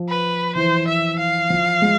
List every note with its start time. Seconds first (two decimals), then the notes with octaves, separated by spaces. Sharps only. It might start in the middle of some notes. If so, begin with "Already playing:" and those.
Already playing: F3
0.09 B4
0.55 E3 C5
0.87 E5
1.19 F5
1.50 F3
1.82 G#3